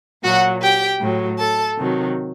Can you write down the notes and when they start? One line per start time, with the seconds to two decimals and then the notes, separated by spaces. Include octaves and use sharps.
0.23 A#2 F#3 F#4 F#5
0.62 G4 G5
1.00 A2 F#3
1.39 A4 A5
1.77 C3 D#3 F#3